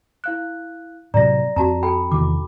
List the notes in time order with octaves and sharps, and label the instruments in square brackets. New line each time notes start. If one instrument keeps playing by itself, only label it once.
[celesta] E4 F5 F#6
[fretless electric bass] A2 C3 F#3 [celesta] D5 A#6 [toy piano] A#5
[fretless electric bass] F2 [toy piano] F#4 A5 A#5
[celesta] A4 B5 [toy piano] G5
[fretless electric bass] E2 C3 D#3 [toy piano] D6